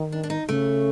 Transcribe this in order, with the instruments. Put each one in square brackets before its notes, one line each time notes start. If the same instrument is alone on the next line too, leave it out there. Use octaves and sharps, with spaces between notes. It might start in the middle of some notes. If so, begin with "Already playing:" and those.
Already playing: [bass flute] D#3
[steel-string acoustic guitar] D4
D4
D#4
[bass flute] C#3 [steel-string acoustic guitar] A3